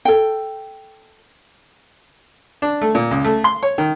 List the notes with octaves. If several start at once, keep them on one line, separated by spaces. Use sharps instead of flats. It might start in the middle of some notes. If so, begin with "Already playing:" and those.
A4 G5
D4
A3
A#2
C#2
A3
C6
C#5
D#3